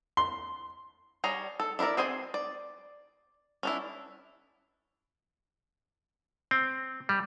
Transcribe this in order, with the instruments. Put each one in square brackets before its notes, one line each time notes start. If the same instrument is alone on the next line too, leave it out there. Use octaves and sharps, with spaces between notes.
[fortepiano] C6
[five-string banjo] G3 G#4 C#5 A#5
A4
D4 E4 F#4 A#4 D5
C4 G#4 C5 G#5
D5
C#4 D4 E4
[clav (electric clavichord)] C4
G3